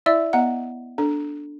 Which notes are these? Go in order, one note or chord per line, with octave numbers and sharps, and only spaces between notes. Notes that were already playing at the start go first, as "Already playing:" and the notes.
E4 D5 E5 E6
B3 D#5 F#5 A#5
D4 A4